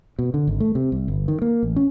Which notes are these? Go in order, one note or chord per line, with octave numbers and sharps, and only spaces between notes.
B2
D3
G#1
A3
C3
C2
G1
D#3
A#3
A1
C#4